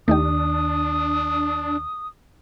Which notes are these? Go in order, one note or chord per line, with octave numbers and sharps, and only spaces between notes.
D#2 A3 D4 D#4 G4 D#6